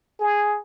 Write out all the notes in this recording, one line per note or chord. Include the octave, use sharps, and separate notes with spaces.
G#4